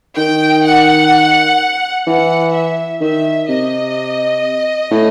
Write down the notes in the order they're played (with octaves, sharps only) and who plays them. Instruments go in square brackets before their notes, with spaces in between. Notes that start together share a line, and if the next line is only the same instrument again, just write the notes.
[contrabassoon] D#3 [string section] G5
[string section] F#5
[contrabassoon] E3 [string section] F#5
[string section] E5
[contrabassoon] D#3 [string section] E5
[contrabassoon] C3 [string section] D#5
[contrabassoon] A2